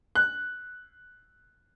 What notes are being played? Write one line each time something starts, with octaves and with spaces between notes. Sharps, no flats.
F#6